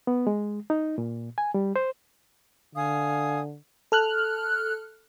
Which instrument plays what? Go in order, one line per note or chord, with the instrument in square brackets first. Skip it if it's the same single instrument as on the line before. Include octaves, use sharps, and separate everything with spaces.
[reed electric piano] B3
G#3
D#4
A#2
G#5
G3
C5
[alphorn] D3 [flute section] F5 G#5 D#6
[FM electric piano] A4 F6 F#6